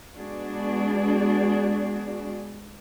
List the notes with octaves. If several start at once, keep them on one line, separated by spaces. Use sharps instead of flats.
G#3 B3 D4 F#4 G#4 D5